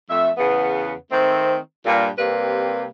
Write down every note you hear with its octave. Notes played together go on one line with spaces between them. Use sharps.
F2 A3 E5
E2 C#3 B3
D#3 A3 C4
G2 A#2
C3 G3 A#3 C4 B4